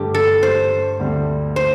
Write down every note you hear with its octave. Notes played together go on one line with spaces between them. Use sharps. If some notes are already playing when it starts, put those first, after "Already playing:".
Already playing: G2 D3 A3 G4
A4
C5
D2 D3 G3 C4
C5